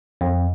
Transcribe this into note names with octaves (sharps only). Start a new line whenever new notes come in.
F2